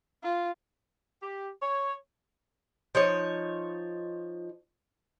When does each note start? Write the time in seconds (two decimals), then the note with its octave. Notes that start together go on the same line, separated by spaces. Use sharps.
0.23 F4
1.22 G4
1.61 C#5
2.95 F3 D#4 C#5